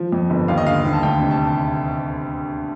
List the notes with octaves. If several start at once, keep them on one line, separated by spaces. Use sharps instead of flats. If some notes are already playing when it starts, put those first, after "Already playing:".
Already playing: F3
F2
G1
D#2 F5
D#5
D3 F5
D#2
A5
D2 G5
C3
A5